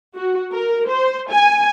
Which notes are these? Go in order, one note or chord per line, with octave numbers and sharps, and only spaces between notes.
F#4
A#4
C5
G#5